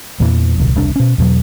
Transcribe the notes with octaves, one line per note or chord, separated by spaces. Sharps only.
E2 A#2 E3
D#1 C2
E1 C2 D4
B2 C#4
E2 B2 F#3